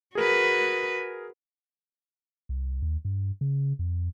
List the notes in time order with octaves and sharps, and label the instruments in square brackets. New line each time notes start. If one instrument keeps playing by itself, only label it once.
[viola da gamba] F#4 B4 [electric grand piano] G#4 A#4
[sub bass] C2
D#2
G2
C#3
F2